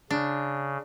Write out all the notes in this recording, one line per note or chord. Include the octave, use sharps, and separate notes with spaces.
C#3 D4